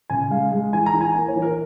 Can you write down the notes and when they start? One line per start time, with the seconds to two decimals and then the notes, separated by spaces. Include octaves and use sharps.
0.10 C#3 G#5
0.30 G#3 F5
0.52 G#3
0.73 E3 G#5
0.86 A#5
0.94 E3
1.01 G#5
1.14 A#3 G#5
1.28 C#5
1.36 E3
1.42 A#4